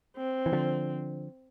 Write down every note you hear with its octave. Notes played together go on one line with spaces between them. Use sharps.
C4
E3
D3 F3